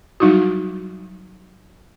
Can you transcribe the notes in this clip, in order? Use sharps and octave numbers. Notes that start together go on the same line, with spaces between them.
F#3 G3 D#4 E4 F#4